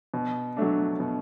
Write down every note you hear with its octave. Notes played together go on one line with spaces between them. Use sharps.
B2
F#3 A3 D4
B2